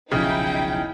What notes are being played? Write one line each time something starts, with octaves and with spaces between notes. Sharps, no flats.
D#1 B1 C#3 F3 D#4 E4 G5